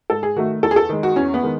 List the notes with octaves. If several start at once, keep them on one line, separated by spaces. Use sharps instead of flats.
G#2 A4
G#4
D#3 A3 F#4
E2 A4
G#4
A4
D#3 G#3
F#4
E2 C#4
B3
D#3 G#3